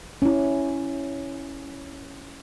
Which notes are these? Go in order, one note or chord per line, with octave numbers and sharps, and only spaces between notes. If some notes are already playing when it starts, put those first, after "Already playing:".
C#4 E4